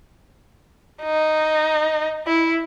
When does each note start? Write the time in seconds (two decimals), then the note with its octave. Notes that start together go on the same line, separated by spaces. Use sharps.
1.03 D#4
2.27 E4